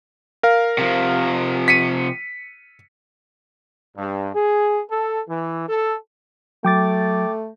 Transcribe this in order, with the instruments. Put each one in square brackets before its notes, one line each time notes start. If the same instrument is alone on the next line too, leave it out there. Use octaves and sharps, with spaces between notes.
[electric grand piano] A#4 F5
[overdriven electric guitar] C3 F3
[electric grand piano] B6 C#7 D#7
[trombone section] G2
G#4
A4
E3
A4
[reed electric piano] F#3 [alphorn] A3 [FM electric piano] G5 D6 A6